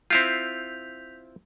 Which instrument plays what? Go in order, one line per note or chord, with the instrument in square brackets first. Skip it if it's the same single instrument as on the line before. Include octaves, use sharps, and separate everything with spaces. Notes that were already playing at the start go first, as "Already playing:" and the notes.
[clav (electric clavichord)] C4 E4 F4 [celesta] G6 B6 F7